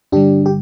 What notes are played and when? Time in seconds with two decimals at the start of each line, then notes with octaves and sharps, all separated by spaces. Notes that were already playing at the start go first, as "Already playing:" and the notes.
0.12 G2 D3 G3 D4 G4
0.46 G4